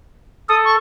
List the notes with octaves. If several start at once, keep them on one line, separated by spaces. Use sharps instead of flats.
A4 D#6
C#6